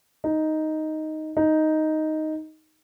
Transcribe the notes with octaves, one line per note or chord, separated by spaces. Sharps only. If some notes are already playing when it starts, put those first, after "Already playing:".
D#4
D#4